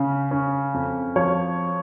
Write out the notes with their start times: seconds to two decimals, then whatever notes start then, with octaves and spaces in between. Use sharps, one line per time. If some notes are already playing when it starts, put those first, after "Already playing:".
Already playing: C#3 C#4
0.31 C#4
0.74 F2
1.16 F3 C#5